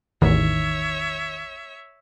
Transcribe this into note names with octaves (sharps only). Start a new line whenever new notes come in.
A1 E2 D#3 C#5 E5